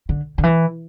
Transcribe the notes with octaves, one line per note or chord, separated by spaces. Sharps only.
D3
D3
E3